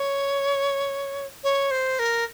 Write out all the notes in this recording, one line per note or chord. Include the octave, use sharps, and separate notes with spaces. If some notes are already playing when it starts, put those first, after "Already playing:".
Already playing: C#5
C#5
C5
A#4